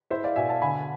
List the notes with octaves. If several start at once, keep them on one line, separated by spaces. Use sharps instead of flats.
E4 C5 E5
D5 F5
B2 E5 G#5
F5 A5
D3 G#5 B5